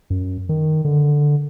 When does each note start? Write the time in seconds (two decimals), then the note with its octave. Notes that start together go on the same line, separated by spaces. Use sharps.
0.10 F#2
0.49 D#3
0.85 D3